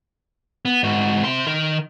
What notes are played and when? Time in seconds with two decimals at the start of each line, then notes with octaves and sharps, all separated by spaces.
0.65 B3
0.83 G#2 F#4
1.24 C3 C6
1.47 D#3 A#4